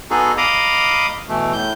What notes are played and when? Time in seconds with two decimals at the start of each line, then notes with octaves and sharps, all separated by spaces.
0.11 B3 D#4 F#4 G#4 A4
0.37 D#5 F5 A#5 B5 D6 D#6
1.29 B2 E3 A3
1.53 A2 G6